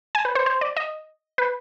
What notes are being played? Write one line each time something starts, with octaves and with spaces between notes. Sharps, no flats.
G#5
B4
C5
C5
D5
D#5
B4